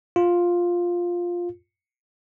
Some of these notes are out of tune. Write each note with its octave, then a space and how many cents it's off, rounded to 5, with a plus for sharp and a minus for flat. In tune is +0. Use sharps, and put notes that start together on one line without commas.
F4 +5